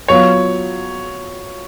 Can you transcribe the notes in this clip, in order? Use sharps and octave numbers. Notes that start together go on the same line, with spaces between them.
F#3 B3 F4 C#5